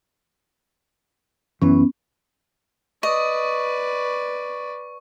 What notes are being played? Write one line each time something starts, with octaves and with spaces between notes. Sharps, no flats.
F#2 E3 B3 C#4
B4 D5 D#5 C#6